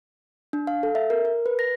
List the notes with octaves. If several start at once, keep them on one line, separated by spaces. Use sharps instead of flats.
D4
F5
A4
E5
A#4
A#4
B4
A#6